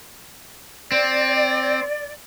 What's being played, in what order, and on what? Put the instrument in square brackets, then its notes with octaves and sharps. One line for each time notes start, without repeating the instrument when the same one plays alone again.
[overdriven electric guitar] C4 [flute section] D5